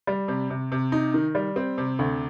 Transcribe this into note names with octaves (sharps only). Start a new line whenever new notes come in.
G3
C3
C3
C3
D#4
D#3
G3
C4
C3
D2